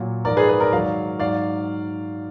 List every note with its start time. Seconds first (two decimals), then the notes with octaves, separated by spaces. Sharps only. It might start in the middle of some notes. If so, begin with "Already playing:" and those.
Already playing: A#2 F#3
0.25 G#2 F3 A#4 D5
0.37 G#4 B4
0.49 G#4 B4
0.60 A#4 D5
0.72 G#2 D#3 F#3 D5 F5
1.20 G#2 F#3 D5 F5